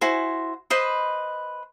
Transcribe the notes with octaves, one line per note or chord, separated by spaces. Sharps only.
E4 F#4 C5 G#5
B4 C5 D#5 B5